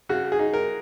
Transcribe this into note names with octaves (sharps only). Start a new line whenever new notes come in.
C#3 F#4
G#4
D#4
A#4